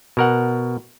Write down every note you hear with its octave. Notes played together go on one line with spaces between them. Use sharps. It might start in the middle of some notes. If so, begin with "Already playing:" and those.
B2 A#4 F#5